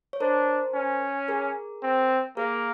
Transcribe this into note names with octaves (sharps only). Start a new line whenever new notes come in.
C#5
D4 A#4 C5
C#4
G#4 A#4
C4
A#3 G#4 A#4